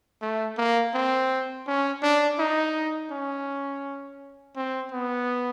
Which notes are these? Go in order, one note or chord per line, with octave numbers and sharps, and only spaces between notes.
A3
A#3
C4
C#4
D4
D#4
C#4
C4
B3